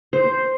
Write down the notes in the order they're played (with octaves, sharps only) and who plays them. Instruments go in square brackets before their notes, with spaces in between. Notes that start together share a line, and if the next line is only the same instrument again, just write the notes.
[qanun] C5